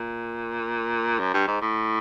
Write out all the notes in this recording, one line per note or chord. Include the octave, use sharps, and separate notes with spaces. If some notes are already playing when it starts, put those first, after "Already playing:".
Already playing: A#2
F#2
G2
G#2
A2